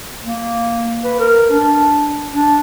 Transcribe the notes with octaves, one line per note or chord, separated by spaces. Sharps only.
A#3
B4
A#4
D4
D4